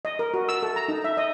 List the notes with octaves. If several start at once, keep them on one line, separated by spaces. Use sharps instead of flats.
D#5
A#4
F#4
E6
A4
A#5
D#4
E5
D#5